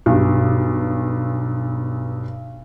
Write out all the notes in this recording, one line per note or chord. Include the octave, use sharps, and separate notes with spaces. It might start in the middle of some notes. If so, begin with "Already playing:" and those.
B1 G2